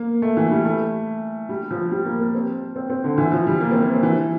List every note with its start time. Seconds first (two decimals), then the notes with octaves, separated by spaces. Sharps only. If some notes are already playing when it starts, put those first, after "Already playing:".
Already playing: A#3
0.22 A3
0.37 E3
0.51 G3
0.65 A3
1.49 G3
1.71 F3
1.92 G3
2.05 A#3
2.20 A#3
2.34 C4
2.76 C4
2.90 C4
3.04 D3
3.18 E3
3.32 F3
3.47 G3
3.60 A#3
3.71 C4
3.82 A#3
3.93 C4
4.03 E3